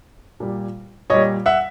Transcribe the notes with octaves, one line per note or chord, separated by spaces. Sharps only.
A#2 G3
A#2 G3 C#5 D#5
E5 F#5